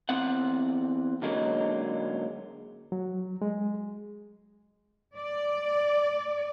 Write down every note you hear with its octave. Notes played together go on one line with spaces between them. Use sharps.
E2 C4 F#5
D3 F#3 G#3 A#3 C#4 D#4
F#3
G#3
D5